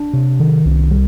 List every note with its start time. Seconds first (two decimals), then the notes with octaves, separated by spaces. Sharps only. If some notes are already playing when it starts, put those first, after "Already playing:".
Already playing: D4
0.13 C3
0.40 D#3
0.65 C2
0.91 G3